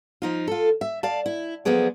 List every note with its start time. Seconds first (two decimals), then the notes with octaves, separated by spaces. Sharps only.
0.22 F3 D#4 F4
0.48 F4 A4
0.81 E5
1.03 D5 F5 A5
1.26 E4
1.65 D2 F3 F#3 B3 G#4 D5